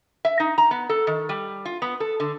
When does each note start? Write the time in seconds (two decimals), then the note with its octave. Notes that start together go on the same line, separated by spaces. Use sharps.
0.25 E5
0.40 D#4
0.58 A#5
0.71 B3
0.89 A4
1.07 D#3
1.29 G3
1.65 F4
1.82 B3
2.00 A4
2.20 D3